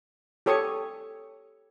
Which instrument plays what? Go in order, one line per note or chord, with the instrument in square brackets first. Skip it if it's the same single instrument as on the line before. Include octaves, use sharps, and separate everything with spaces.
[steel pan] G4 A4 C#5 C#6 D#6